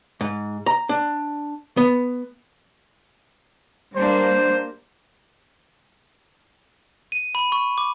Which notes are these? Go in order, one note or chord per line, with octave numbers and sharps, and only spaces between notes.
G#2
A#5
D4
B3
G3 A#3 D4 C5
D#7
B5
C#6
D6